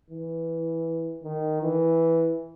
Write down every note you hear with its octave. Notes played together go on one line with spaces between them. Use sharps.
E3
D#3
E3